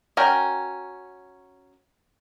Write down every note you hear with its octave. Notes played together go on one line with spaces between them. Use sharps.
C#4 F#4 A#4 G5